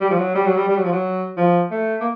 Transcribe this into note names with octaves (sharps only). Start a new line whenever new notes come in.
G3
F3
F#3
G3
F#3
G3
G3
F#3
F3
F#3
F3
A3
A#3